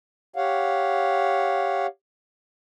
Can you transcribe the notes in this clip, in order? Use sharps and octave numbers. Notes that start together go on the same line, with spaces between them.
G4 C#5 F5 F#5